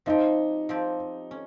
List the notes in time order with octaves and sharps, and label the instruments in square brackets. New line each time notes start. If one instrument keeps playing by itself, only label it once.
[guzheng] F3 C4 G4 [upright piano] D#4
[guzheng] F3 C4 G4
C#4